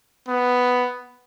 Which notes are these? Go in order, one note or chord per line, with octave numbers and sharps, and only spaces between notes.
B3